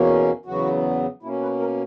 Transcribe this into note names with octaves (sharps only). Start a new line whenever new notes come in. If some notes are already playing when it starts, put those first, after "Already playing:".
Already playing: E2 B2 A#3 C#4
E2 C#3 F#3 B3 F#4
B2 A#3 C#4 E4
B4
A#4